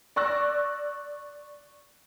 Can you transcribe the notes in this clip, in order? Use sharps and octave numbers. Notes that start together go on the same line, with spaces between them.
D5 C#6 E6 F#6 A#6